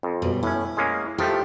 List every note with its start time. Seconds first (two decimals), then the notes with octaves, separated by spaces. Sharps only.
0.03 F2
0.22 F#2 B2 G3
0.43 A2 C#4 E4
0.77 G#3 A#3 C#4
1.18 D#3 F3 A3 G4